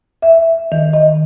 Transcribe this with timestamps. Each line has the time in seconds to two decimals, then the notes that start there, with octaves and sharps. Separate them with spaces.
0.22 E5
0.72 D#3
0.93 D#5